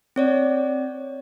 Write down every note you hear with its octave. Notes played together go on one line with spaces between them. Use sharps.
C4 C#5 D5